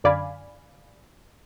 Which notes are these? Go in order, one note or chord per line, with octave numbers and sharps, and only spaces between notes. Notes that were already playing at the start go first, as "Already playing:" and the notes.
F#2 D3 D5 F5 G#5 B5